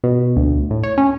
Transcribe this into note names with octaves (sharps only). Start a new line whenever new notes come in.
B2
D2
A2
C#5
C#4